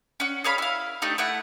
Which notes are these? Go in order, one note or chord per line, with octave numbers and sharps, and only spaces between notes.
C#4 F#5
G#4 C#5 F5 B5
E4 F5
A3 D4 D#4 G4
A3 E4 F#5